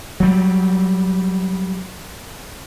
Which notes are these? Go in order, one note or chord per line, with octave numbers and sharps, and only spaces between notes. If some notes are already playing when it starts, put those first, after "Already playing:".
F#3 G3